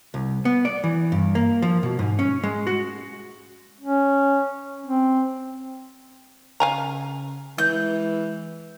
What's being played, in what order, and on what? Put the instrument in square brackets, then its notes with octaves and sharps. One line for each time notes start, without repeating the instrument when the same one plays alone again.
[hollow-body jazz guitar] C2
B3
D5
E3
G2
A#3
F3
B2
G#2
C#4
G#3
F#4
[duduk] C#4
C4
[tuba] C#3 [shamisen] F5 G#5 A#5
[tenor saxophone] E3 [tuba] G#3 [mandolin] G6